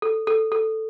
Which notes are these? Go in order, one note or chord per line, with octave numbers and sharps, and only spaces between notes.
A4
A4
A4